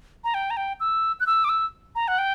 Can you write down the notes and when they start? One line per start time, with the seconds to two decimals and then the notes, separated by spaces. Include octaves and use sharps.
0.24 A#5
0.34 G5
0.51 A#5
0.57 G5
0.80 E6
1.20 F#6
1.26 E6
1.44 D6
1.49 E6
1.95 A#5
2.08 F#5
2.18 G5